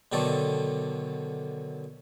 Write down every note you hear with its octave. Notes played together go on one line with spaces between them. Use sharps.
B2 D3 D#3 F#3 A4 D5